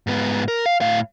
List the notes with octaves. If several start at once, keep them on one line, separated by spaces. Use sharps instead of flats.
G#2 B3
A#4
F5
A2 F5